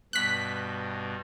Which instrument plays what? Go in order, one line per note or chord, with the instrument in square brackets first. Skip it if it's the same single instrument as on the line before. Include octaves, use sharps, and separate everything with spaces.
[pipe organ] G2 B2 [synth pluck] F#6 B6